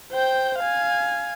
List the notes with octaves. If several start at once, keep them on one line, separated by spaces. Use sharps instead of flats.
C5 G5
F5 G#5